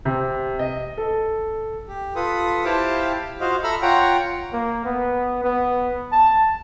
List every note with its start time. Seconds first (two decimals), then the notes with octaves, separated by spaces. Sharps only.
0.05 C3
0.59 D#5
0.98 A4
1.87 G4
2.16 F4 A4 B4 D#6
2.65 E4 G4 C5 F5 G5 A5
3.41 F4 F#4 C5 D#5 F5
3.63 A4 E5 A#5 B5 E6 F6
3.82 F4 C#5 F#5 G5 A#5
4.53 A#3
4.85 B3
5.44 B3
6.12 A5